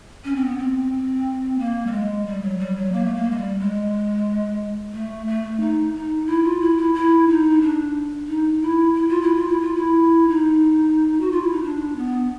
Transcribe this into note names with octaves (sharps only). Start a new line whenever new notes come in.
C#4
C4
B3
C4
A#3
G3
G#3
G3
F#3
G3
F#3
A#3
A3
A#3
G#3
G3
G#3
A3
A3
D#4
D#4
E4
F4
E4
E4
E4
D#4
D4
D#4
E4
E4
F4
E4
F4
E4
F4
E4
D#4
F#4
F4
E4
D#4
D4
B3